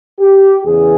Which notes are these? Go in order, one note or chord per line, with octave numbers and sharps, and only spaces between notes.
G4
E2 C#3 E3 G#4